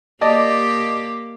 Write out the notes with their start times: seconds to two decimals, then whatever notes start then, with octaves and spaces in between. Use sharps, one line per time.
0.21 A#3 G4 D5 D#5 A5